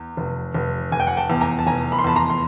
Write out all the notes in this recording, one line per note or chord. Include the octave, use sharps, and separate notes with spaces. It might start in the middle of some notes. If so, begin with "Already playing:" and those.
Already playing: E2
F1
F1
F1 G#5
G5
F#5 G#5
G5 A5
E2
G#5 A#5
A5
F1 G#5 A#5
B5
C6
E2 A5 B5
A#5 C6
C6